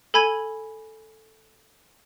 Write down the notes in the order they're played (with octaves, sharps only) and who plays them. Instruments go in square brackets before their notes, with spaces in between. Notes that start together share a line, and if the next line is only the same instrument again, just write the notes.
[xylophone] A4 G#5 B5 G#6 D#7 F#7